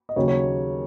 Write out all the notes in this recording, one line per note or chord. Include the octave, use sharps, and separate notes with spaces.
D#5
D#2 C#3 F#3 C#5
C#5